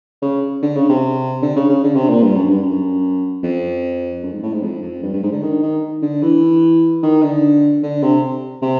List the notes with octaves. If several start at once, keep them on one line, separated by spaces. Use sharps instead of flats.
C#3
D3
C#3
C3
D3
C#3
C#3
D3
C3
A#2
G2
F#2
G2
F#2
F2
F#2
G#2
A2
G#2
F2
F2
G2
G2
G#2
D3
D#3
D#3
D3
E3
D#3
D3
D3
C3
C3